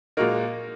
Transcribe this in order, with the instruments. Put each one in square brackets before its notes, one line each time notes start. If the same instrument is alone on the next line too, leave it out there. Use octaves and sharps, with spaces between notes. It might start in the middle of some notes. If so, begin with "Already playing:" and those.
[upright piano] A#2 G#3 F#4 A#4 [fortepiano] A#3 D#4